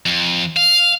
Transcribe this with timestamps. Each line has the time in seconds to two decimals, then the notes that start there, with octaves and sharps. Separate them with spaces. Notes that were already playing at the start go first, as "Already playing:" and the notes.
0.06 F2
0.56 F5